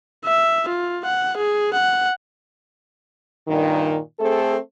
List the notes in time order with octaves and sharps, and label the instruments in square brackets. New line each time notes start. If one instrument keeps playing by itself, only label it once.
[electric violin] E5
F4
F#5
G#4
F#5
[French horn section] G2 A#2 D#3
A3 C4 G#4 A4